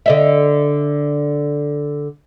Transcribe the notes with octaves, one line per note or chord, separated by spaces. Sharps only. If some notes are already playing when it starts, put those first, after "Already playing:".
D3 D#5 E5